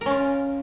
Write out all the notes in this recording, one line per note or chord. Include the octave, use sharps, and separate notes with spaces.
C#4 F4 A#4